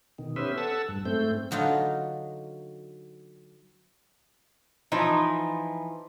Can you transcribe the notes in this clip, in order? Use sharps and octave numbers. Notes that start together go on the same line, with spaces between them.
B2 D#3
B3 C#4 G4 B4 C5 E5
A4 F#5 A5 E6
G2
G#2 A3 C4 G6
D3 F#3 D#4 F4
E3 F3 D#4